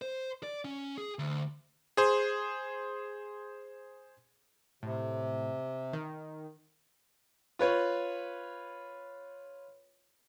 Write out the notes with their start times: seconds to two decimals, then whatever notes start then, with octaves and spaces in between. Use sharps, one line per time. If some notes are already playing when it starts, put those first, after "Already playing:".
0.02 C5
0.43 D5
0.65 C#4
0.98 G#4
1.19 D2
1.97 G#4 C5
4.83 A2 C3
5.93 D#3
7.59 F4 B4 C#5